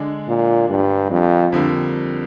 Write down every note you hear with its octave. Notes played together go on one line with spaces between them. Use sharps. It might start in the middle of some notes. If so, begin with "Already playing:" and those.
Already playing: D3 G#3 D4
A#2
G2
F2
F2 D3 G3 A#3